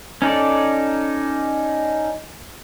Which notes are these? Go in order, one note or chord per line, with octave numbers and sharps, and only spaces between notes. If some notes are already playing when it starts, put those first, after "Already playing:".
C#4 D#4 A4 D5